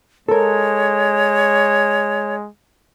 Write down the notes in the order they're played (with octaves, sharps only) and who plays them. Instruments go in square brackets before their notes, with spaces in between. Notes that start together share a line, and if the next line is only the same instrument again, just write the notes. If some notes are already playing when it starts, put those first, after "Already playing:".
[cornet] G#3 [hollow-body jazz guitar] A4 A#4 [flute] C#5